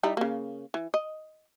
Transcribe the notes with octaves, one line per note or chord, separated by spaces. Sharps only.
G3 D#4 E4
C#3 A#3
E3
D#5